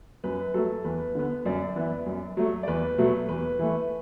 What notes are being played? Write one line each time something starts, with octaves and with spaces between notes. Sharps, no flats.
F#2 B4
F#3 A3 A4
E2 B4
D3 B3
F#2 D5
E3 B3
F#2
F#3 A3
D5
E2 B4
B2 F#3 A3
E2 B4
E3 A3